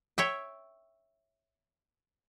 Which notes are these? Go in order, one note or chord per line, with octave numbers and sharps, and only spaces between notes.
C#5 E5 G5